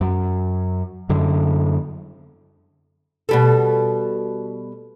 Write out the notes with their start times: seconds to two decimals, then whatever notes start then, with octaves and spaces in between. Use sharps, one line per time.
0.01 F#2
1.09 F#2 D3
3.29 B2 G3 A4